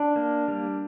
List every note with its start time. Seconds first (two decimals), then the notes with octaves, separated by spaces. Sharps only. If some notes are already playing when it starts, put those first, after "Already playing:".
Already playing: D4
0.16 A#3
0.48 G3